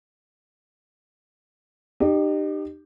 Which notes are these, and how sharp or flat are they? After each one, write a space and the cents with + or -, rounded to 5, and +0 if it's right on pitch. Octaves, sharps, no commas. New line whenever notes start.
D#4 -40 G4 +0